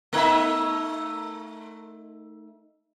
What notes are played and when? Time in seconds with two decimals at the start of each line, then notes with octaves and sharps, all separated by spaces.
0.13 A3 D#4 E5